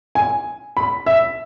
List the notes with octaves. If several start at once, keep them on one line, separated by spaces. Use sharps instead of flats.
G#5
B5
E5